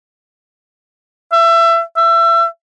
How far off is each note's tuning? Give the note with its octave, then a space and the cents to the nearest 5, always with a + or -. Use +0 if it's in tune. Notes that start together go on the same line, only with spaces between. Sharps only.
E5 +25
E5 +30